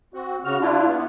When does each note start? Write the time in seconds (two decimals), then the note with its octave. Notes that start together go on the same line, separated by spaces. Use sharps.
0.14 C4 F#4
0.45 C#3 F#4 F6
0.61 D4 E4 F4
0.87 B3